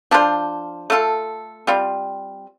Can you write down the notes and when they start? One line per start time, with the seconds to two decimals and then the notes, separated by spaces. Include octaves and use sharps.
0.11 F3 D4 F4 C5
0.90 A3 F4 A4
1.67 G3 C4 F4